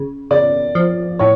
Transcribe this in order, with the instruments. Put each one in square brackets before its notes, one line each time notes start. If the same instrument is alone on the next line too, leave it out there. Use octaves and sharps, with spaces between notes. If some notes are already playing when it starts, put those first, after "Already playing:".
Already playing: [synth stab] C#3
[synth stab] C#3 [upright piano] D5
[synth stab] F3
[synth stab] A2 [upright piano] C#5